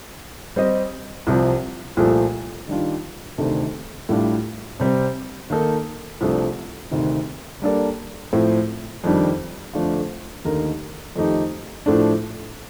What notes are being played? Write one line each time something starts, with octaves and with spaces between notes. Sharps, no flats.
G3 C4 G4 C5 D#5
C2 C3 F3
C2 A#2 F3 A3
D#3 G3 D4 F4
D2 C3 D#3 A3 D4
A2 G3 D4 F4
C3 G3 C4
D#3 A#3 D#4 A4
C2 C3 F3 A3 D4
D2 C3 D#3
G3 A#3 D4 A4 D5
A2 F3 C4
F2 D#3 G3 D4
F2 D3 A3 D4 F4
D#2 D3 A3 D#4 A#4
F2 D#3 A3 D#4 G4
A2 F3 A3 D4